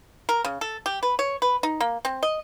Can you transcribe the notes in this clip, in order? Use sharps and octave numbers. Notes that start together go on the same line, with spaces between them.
A#4
C#3
A4
G4
B4
C#5
B4
D#4
A#3
C4
D#5